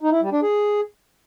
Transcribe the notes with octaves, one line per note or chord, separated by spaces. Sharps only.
D#4
E4
G3
D4
G#4